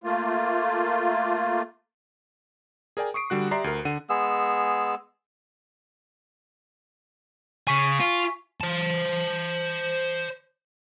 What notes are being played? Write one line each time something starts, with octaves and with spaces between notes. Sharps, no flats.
A3 A#3 F4
G#4 A#4 D5 G5 G#5
C#6 D#6 C7 D7
D3 G3 F#4 F#6
G4 D5 E5 A#5 C6 C7
D2 A#4
D3 F#5 D#7
G#3 B3 G#4 E6
C#3 G#4 G#5 C#6 B6
F4
C5 A5